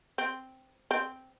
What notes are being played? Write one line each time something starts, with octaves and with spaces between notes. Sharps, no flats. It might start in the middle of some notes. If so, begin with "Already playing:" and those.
C4
C4